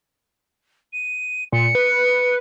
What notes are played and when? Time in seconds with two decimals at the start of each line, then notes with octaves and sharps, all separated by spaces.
0.93 D#7
1.52 A#2 C#7
1.75 B4